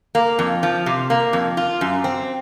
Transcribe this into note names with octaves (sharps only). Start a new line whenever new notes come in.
A#3
F2
F3
C3
A#3
F2
F4
F#2
C4